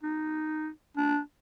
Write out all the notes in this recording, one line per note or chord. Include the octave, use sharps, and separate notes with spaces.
D#4
D4